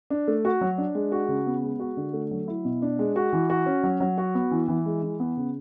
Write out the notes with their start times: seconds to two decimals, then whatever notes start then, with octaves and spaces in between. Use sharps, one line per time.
0.10 D4
0.28 A3
0.45 F#4
0.61 F#3
0.78 D4
0.95 G#3
1.12 F#4
1.28 C#3
1.46 B3
1.63 G#3
1.80 F#4
1.97 D3
2.13 A3
2.31 F#3
2.48 E4
2.65 B2
2.82 D4
2.99 G#3
3.16 F#4
3.33 E3
3.50 F#4
3.66 C#4
3.83 F#3
4.00 F#3
4.18 F#4
4.35 B3
4.51 E3
4.68 E3
4.86 G#3
5.02 E3
5.20 B3
5.37 C#3